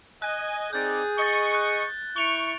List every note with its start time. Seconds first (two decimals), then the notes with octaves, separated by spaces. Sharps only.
0.22 D#5 G#5 F#6
0.73 C4 D#4 G#4 D5 G6 A6
1.18 D#5 C#6 A6 G7
1.55 F#6
2.16 E4 C#6 D7 F7 G7